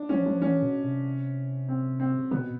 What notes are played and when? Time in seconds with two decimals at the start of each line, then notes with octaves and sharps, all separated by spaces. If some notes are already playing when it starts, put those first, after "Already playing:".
Already playing: D4
0.09 F3 C#4
0.26 F3
0.42 E3 C#4
0.63 B2
0.83 C3
1.68 C4
2.00 C4
2.31 B2 B3